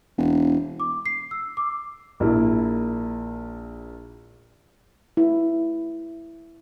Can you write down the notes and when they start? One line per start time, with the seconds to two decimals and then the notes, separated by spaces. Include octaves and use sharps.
0.18 E1
0.80 D6
1.06 C7
1.31 E6
1.57 D6
2.20 A#1 A#3 E4
5.17 E4